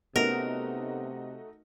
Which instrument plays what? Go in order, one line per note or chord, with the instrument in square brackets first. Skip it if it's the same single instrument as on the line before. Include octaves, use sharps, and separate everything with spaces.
[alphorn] C3 [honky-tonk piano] A3 D#4 F#4 [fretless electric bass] B3 C#4 [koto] A#4